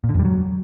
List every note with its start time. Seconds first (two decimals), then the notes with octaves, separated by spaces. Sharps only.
0.04 A#2
0.09 D3
0.14 F2
0.19 G3
0.25 F#3